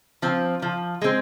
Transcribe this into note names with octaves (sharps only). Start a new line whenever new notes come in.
F3 C4
F3
G#3 C4